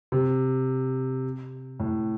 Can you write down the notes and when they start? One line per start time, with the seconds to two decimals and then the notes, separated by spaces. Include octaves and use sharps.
0.12 C3
1.80 A2